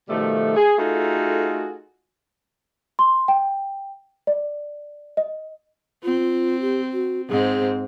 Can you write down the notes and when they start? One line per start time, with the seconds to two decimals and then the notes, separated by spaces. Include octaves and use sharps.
0.09 B2 D#3 F3 G3 A3
0.56 G#4
0.78 A3 D#4 F4 F#4 G#4 A4
2.99 C6
3.28 G5
4.27 D5
5.17 D#5
6.04 C4 F4
6.61 G4
6.93 F#4
7.30 G#2 C4 G#4